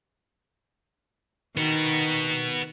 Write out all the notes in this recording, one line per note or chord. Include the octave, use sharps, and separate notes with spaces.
D#3 B3 F#4